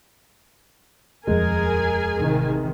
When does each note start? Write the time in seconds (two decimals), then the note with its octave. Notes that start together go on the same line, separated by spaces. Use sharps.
1.27 D#1 F2 G#3 G#4 A#4 G#5
2.16 A1 C3 D#3